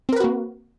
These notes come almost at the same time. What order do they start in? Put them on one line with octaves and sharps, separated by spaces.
C4 A#4 B4 F#4 A#3